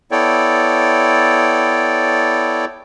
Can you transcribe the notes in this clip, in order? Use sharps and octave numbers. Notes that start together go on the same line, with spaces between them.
B3 E4 A4 C#5 D5 G5